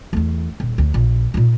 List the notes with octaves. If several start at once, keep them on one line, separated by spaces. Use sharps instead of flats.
E2 A3
D#1
D2
A#1
A#2 D#4